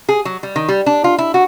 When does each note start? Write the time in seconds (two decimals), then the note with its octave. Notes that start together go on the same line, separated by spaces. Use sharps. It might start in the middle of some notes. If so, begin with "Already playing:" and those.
0.09 G#4
0.25 F#3
0.43 G3
0.56 D#3
0.69 G3
0.86 D4
1.04 F4
1.18 E4
1.34 F#4